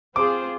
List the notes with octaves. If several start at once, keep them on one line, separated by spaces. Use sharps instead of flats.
C4 F4 G#4 C5 D6